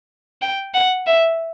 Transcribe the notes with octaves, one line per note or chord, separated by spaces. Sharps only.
G5
F#5
E5